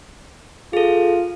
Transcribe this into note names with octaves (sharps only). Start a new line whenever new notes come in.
F4 G#4 A4